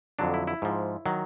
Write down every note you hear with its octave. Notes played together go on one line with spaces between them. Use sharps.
F2 D3 F#3 D4
E4
E4
G#2 F3
D#3 F#3